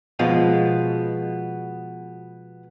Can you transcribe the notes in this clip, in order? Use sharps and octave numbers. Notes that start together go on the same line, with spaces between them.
B2 F3 G#3 B3